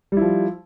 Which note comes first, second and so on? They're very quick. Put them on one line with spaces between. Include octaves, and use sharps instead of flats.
G3 E4 F3